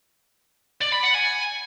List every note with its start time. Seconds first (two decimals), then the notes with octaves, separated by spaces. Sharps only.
0.81 D5
0.92 B5
1.03 F#5
1.14 G#5